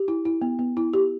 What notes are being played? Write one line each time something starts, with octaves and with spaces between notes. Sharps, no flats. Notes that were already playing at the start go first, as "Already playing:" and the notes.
Already playing: G4
E4
E4
B3
B3
E4
G4